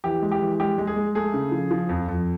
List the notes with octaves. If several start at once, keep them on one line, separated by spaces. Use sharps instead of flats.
E3 G4
G#3
G4
E3
G#3 G4
G#3
G#4
G#3
A3 G#4
C#3
F3
F3
F2
F2